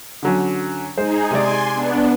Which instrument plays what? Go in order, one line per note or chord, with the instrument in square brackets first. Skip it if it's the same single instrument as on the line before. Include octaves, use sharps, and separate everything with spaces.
[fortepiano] D3 F#3 C#4
[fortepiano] G#3 C5 [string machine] D#4 G#4
[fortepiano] C3 G#3 D5 [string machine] G#5 C6
[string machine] B3 D4